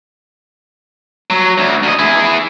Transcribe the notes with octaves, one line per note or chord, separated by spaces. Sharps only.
F#3
D2
D2 D#5
E4 G#4